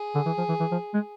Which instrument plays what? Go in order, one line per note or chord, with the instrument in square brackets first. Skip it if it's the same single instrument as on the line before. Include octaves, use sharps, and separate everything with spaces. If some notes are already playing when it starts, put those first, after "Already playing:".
Already playing: [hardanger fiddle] G#4
[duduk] D3
E3
F3
E3
E3
F3
G#3